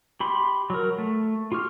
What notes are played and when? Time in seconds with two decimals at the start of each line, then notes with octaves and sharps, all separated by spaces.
0.20 G4 B5 C6
0.70 F#3 A#4
0.98 A3
1.52 F4 G4 C#6 F6